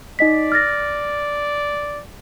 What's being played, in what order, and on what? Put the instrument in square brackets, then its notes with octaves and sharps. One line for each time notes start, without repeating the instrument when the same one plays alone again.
[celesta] D#4 D#5 B6 [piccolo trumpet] D5
[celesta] F6 A6 A#6